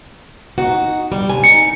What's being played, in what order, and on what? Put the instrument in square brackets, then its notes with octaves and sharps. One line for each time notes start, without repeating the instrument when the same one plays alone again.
[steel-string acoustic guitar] D#4 F#4
G3
C3 G#5
[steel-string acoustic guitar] D#4 [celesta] C#7